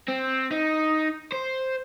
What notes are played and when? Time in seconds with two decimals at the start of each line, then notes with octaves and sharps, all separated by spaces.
0.09 C4
0.51 D#4
1.32 C5